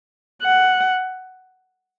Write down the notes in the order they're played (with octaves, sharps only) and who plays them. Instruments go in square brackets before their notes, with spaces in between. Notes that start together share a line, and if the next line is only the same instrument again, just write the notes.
[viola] F#5